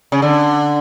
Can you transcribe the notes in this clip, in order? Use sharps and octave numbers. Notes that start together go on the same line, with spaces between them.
C#3
D3